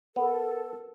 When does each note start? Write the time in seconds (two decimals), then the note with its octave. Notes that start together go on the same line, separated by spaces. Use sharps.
0.16 B3 A4 A#4